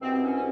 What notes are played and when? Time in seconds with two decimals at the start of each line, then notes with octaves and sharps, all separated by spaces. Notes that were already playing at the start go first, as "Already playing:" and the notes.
0.01 C2 B2 C4
0.12 C4
0.23 C#4
0.34 C#4